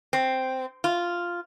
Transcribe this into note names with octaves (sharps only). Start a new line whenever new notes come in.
C4
F4